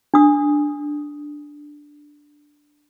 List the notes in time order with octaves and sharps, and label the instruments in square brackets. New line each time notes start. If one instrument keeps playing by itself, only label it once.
[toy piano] D4 D#6